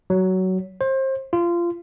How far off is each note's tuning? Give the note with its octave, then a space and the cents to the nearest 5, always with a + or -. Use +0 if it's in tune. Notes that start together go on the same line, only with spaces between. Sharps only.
F#3 +15
C5 +30
F4 -20